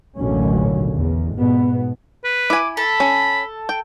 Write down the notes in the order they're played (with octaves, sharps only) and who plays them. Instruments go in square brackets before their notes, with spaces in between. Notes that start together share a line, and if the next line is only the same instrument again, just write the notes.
[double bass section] A1 D#2 B2 D3 F#3 C#4
E2
G#2 B2 B3
[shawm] B4
[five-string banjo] E4 G#5 [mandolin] D6
[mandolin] A4 [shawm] B5
[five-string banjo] C#4
G5